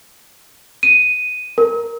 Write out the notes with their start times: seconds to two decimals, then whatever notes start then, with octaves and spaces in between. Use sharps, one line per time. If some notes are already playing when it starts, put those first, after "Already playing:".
0.83 D#7
1.58 A#4